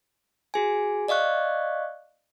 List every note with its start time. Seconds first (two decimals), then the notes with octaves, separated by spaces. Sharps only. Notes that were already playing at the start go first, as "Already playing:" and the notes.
0.54 F#4 G#4 G#5
1.08 D5 D#5 F5 C#6 F#6